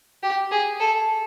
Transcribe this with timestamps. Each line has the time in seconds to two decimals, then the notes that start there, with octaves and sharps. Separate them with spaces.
0.23 G4
0.52 G#4
0.80 A4